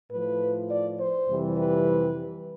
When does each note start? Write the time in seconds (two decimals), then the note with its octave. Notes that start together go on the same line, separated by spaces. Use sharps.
0.11 A2 F3 B4
0.70 D5
0.99 C5
1.28 F2 C3 E3 G3
1.58 B4